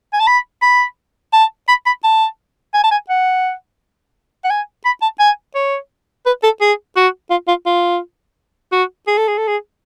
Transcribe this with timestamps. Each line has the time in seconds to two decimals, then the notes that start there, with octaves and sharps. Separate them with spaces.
0.13 G#5
0.20 A5
0.27 B5
0.62 B5
1.33 A5
1.68 B5
1.86 B5
2.04 A5
2.74 G#5
2.84 A5
2.91 G#5
3.09 F#5
4.44 F#5
4.50 G#5
4.85 B5
5.02 A5
5.19 G#5
5.55 C#5
6.26 B4
6.43 A4
6.61 G#4
6.96 F#4
7.30 F4
7.48 F4
7.66 F4
8.72 F#4
9.07 G#4
9.18 A4
9.28 G#4
9.38 A4
9.48 G#4